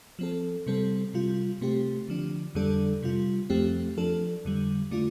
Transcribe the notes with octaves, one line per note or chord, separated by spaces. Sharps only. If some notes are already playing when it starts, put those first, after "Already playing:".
F3 C4 A4
C3 G3 C4 A4
C3 G3 F4
C3 A3 C4 G4
D3 F3 D4
F2 D3 G3 D4 A4
C3 G3 F4
F2 F3 A3 C4 G4
F3 D4 A4
F2 D3 G3
D3 A3 D4 F4